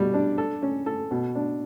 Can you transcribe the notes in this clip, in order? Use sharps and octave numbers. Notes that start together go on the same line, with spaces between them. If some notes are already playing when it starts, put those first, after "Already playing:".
Already playing: B2 G3
D4
A4
C#4
A4
B2
D4